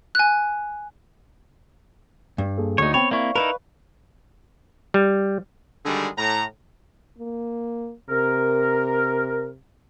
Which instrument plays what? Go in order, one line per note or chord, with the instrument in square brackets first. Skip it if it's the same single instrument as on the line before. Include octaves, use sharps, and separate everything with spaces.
[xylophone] G#5 F#6
[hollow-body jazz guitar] G2
[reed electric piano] A#3 G#4 A4
[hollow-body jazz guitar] D2 [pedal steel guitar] D#4 C#5
[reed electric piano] B3 G5 B5 [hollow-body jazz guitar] C4 [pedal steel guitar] C#5
[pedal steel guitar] A#3 E4 [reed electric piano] D5 F5 C#6
[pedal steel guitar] D#4 E4 A#4 [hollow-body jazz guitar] B4
[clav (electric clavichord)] G3
[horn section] D3 D#3 G3 G#3 F#4 G#4
A2 A#5
[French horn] A#3
[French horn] C3 [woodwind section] A#4